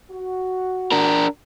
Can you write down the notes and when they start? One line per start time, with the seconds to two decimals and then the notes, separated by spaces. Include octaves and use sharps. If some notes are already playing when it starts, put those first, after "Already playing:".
0.10 F#4
0.92 D4 A#4